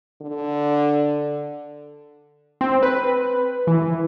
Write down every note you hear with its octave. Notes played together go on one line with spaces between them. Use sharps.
D3
C4
B4
E3